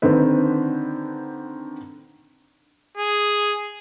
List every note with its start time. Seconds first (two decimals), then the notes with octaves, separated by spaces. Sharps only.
0.02 D3 D#3 C4 B4
2.97 G#4